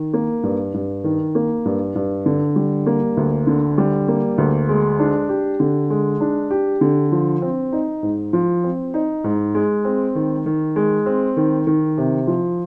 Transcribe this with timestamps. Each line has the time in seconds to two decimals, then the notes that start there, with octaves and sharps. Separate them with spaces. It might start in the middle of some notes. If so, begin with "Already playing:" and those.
Already playing: D#3
0.13 A#3
0.43 G2
0.74 G2
1.04 D#3
1.35 A#3
1.65 G2
1.95 G2
2.26 D3
2.56 G3
2.86 A#3
3.17 D2
3.47 D3
3.78 G3
4.08 A#3
4.38 D2
4.69 G#3
4.99 D4
5.29 G4
5.60 D3
5.90 G#3
6.21 D4
6.51 G4
6.81 D3
7.12 F3
7.42 C4
7.72 D#4
8.03 G#2
8.33 F3
8.64 C4
8.94 D#4
9.24 G#2
9.55 G#3
9.85 C4
10.15 D#3
10.46 D#3
10.76 G#3
11.06 C4
11.37 D#3
11.67 D#3
11.98 C3
12.27 F3